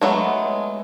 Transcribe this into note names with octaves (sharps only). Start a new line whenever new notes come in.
F#3 G#3 A3 B3